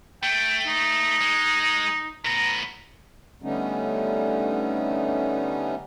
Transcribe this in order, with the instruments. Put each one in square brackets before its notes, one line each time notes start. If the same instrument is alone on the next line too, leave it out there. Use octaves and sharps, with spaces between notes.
[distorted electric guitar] A3 [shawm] G5
[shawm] D#4
[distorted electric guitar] G#3
[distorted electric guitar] A2 B3 [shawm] A#5
[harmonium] D3 G3 A3 B3 C#4 D#4